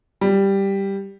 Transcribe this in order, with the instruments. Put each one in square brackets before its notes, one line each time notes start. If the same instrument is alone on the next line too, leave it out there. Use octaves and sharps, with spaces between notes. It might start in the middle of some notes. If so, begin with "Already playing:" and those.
[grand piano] G3